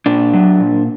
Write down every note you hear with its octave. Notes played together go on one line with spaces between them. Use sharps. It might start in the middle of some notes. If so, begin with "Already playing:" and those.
A#2 D4
F#3
A#2